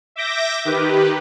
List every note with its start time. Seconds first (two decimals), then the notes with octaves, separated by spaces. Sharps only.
0.16 E5 D6 G6 A#6
0.65 D#3 G4 B4